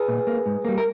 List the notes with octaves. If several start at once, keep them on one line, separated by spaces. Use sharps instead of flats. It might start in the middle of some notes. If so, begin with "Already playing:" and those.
Already playing: G#4 B4
A#2
A#3
G#2
G3 A#3
A#4